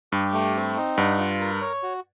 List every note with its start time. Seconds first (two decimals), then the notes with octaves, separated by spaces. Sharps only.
0.12 G2 G4
0.33 A3
0.55 C4
0.77 D#4
0.97 G2 F#5
1.19 F4
1.40 A#4
1.61 C#5
1.83 F#4